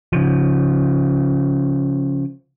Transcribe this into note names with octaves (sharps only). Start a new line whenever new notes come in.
C#3 F3